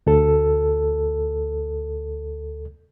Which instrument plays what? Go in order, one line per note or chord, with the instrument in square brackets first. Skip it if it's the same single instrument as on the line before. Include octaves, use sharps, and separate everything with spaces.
[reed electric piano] D2 A4